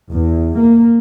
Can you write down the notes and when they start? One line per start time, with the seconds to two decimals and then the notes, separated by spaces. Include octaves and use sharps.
0.12 E2
0.61 A#3